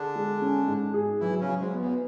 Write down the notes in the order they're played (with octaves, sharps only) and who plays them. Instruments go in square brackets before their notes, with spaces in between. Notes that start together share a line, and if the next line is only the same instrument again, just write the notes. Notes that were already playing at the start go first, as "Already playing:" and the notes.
Already playing: [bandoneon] D3 D4 [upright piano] G#4
[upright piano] G#3
C#4
G#2
G#4
[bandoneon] E3 E4 [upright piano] F#3
[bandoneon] C#3 C#4
[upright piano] F#3
[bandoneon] G#2 G#3
[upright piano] B3
[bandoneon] E2 E3